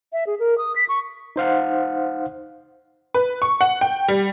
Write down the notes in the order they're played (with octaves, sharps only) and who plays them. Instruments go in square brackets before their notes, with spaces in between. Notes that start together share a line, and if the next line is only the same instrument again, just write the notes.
[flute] E5
G#4
A#4
D#6
B6
C#6
[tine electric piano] D#4 C5 F5 F#5
[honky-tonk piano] B4
C#6
F#5
G5
G3